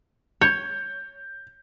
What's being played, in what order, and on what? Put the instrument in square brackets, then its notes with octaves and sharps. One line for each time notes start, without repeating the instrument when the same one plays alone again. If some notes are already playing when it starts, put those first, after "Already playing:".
[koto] C#5 [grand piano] G6